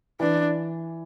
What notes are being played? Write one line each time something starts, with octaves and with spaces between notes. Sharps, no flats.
E3 D4